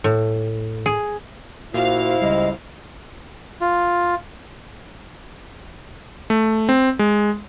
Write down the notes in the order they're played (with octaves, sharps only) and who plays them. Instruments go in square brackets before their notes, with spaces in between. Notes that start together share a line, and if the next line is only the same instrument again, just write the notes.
[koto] A2
G#4
[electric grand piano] A#2 [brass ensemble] E4 C5 [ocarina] F#4 [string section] F5
[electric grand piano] C#2 G3 [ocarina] D#5
[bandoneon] F4
[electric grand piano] A3
C4
G#3